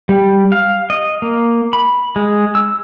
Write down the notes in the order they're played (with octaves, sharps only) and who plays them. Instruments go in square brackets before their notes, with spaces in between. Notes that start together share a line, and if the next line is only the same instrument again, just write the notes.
[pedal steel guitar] G3
F5
D#5
A#3
B5
G#3
E6